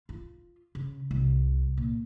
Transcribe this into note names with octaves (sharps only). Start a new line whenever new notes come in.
F4
C#3
C2
A#2